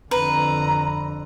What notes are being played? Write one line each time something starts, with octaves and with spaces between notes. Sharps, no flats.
F2 D3 B4 A#5